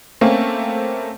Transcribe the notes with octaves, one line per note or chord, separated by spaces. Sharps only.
A3 A#3 C4 C#4